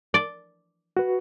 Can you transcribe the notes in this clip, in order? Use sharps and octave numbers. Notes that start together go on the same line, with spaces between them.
D5
F#4 B4